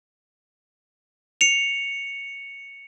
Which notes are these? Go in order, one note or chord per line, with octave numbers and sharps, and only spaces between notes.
C#7 F7